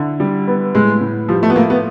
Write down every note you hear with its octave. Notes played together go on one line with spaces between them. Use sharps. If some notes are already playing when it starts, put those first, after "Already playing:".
Already playing: D3 E4
G3
B3
A2 G#3
A2
F3 G3
A3
B3
A3 A#3
B3